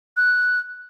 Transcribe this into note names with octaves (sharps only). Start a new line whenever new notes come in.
F#6